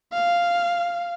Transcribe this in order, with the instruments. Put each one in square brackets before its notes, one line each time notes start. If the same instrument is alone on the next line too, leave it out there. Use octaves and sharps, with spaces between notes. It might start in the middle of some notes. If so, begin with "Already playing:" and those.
[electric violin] F5